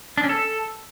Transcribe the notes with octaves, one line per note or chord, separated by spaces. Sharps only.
D4
C#4
A4